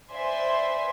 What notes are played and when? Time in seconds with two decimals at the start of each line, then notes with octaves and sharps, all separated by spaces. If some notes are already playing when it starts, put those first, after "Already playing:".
0.10 B4 C5 D5 E5 G#5 C6